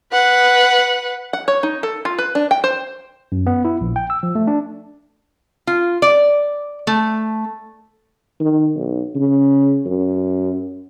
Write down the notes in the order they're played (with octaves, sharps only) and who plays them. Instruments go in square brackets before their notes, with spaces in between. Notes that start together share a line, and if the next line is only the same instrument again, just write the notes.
[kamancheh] B4 F#5
[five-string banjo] F#5
C#5
D#4
A4
F4
B4
D4
G5
C5
[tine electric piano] F#2
B3
E4
A#1
G5
E6
F3
A3
D4
[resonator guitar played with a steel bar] F4
D5
A3
[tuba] D#3
B1
C#3
F#2